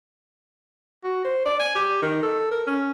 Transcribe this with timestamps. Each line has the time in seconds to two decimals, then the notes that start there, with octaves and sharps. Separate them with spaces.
1.04 F#4
1.24 C5
1.45 D5
1.60 G#5
1.75 G4
2.02 D#3
2.22 A4
2.51 A#4
2.67 C#4